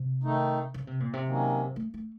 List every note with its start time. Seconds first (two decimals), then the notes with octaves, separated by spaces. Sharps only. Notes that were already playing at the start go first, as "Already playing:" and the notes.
Already playing: C3
0.23 D#3 A3 D#4
0.74 C#3
0.87 C3
1.00 A#2
1.13 C3
1.26 D#3 F#3 A#3 C#4
1.76 A3
1.94 A3